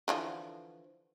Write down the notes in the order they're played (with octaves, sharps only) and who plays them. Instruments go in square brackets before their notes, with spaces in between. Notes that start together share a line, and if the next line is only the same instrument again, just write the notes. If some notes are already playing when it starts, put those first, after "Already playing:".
[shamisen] D3 E3 F3